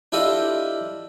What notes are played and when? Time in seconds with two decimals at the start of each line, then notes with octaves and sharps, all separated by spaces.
0.12 D4 E4 F4 G4 A4 D#5